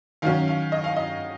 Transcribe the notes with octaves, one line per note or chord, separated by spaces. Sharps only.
D#3 F#3 C#4 F5
F5
D#5
F5
D#5